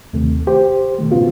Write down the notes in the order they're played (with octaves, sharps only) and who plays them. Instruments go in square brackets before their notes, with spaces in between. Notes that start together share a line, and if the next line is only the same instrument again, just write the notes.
[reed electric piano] D#2 C3 D#3 A3
G4 C5
B2 D#3 A3
G#2 C#3 B3 F4 F#4